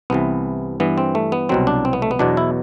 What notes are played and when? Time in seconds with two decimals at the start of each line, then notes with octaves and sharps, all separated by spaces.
0.10 C2 C3 E3 B3
0.80 G2 E3 B3
0.98 C4
1.15 A3
1.32 B3
1.49 C2 B2 F#3 C4
1.67 D4
1.85 C4
1.93 B3
2.02 A3
2.11 B3
2.19 E2 B2 F#3 D4
2.37 E4